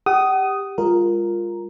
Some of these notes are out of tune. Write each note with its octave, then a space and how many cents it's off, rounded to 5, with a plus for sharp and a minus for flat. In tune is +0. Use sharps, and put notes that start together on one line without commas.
G4 +15 F#5 +40 D#6 +0
G#3 -40 F4 +0 A#4 +0